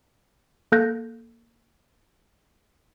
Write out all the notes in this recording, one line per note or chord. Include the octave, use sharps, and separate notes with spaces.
A#3 A4 F#6 G6 A#6